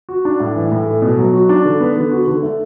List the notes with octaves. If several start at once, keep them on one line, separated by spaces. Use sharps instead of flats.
F#4
D4
A2
E3
A2
A3
B2
F#3
F#4
D4
D3
B3
D3
F#4
D3
A3